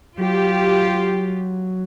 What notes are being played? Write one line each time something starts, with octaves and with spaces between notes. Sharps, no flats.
F#3 F4 G4